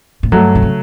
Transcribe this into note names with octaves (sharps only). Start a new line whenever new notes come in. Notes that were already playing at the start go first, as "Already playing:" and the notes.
A2
G2 F#3 A3
D3
C#3